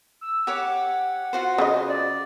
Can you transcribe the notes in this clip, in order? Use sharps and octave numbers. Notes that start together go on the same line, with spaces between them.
E6
G4 C#5 F#5 D6
F4 F#4 C5
C#3 C#4 D#5
D5